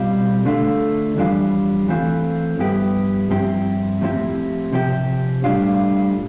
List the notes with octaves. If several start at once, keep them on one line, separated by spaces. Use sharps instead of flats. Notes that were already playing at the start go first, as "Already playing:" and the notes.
Already playing: B2 G3 C4 F4
D3 A3 D4 F4
F2 E3 G3 D4 F4
E3 A3 C4 F4
G2 F3 B3 E4 G4
G2 F3 C4 E4 G4
A2 F3 C4 E4 G4
C3 F3 C4 G4
A2 G3 D4 F4